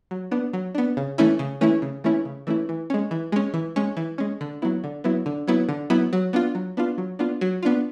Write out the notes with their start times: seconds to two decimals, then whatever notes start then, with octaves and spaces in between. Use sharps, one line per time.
0.11 F#3
0.31 B3 D4
0.53 F#3
0.75 B3 D4
0.97 C#3
1.18 E3 A3 C#4 E4
1.39 C#3
1.61 E3 A3 C#4 E4
1.82 C#3
2.04 E3 A3 C#4 E4
2.25 C#3
2.47 E3 A3 C#4 E4
2.69 E3
2.90 G#3 C#4
3.11 E3
3.32 G#3 C#4
3.54 E3
3.76 G#3 C#4
3.97 E3
4.18 G#3 C#4
4.41 D3
4.62 F#3 B3 E4
4.84 D3
5.04 F#3 B3 E4
5.26 D3
5.47 F#3 B3 E4
5.69 D3
5.90 F#3 B3 E4
6.13 F#3
6.33 B3 D4 F4
6.55 F#3
6.77 B3 D4 F4
6.98 F#3
7.19 B3 D4 F4
7.41 F#3
7.63 B3 D4 F4